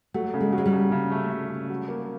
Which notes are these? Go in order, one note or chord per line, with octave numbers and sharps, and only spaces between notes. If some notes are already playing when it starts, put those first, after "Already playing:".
F#3 A3
C#3
G#3
F#3
G#3
G3
C#3
C#3
A3
C#3
C#3
F#3
A#3